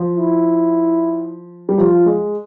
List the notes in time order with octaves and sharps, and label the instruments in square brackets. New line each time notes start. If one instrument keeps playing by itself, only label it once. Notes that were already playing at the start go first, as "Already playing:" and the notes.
Already playing: [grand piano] F3
[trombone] E4
[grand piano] G3
[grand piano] F3 [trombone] F4
[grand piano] G#3